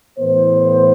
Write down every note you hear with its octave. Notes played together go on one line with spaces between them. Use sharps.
A2 E3 B3 C5